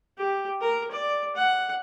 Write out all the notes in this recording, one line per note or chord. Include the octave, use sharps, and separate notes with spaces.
G4
A#4
D5
F#5